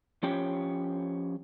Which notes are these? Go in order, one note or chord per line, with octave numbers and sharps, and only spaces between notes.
F3 C#4 G4 C#5 G5